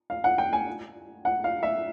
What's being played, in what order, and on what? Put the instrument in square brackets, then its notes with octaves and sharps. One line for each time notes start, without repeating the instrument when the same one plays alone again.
[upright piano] F5
F#5
G5
G#5
F#5
F5
E5